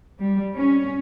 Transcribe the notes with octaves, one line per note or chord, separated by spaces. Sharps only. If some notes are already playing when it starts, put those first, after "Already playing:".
G3
C#4